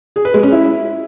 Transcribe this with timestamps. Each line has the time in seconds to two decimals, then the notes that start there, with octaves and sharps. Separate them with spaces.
0.16 G#4
0.25 B4
0.34 G#3
0.43 C#4
0.52 E4